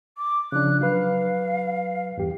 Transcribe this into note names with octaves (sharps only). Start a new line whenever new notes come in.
D6
C#3 F3 D4 F#6
F#3 B4 F5
E2 G2 G4